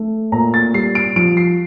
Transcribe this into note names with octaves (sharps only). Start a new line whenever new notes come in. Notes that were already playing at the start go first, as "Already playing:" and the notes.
Already playing: A3
A#2 A#5
A6
G3 C7
D7
F3 D7
C7